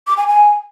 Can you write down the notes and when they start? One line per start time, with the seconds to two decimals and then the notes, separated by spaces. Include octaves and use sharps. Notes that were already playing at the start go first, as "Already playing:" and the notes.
0.07 D6
0.17 G#5
0.27 G#5